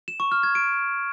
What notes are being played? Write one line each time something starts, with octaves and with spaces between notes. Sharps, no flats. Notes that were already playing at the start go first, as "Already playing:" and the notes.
E7
C#6
F6
G#6
D7